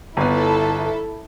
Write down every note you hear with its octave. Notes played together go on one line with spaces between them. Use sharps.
G1 B3 E4 A4